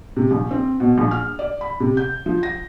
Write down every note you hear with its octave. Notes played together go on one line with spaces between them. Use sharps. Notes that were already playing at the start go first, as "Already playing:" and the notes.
C3
A#1
C4
B2
A#1
F6
D5
B5
C3
G6
F3
A#6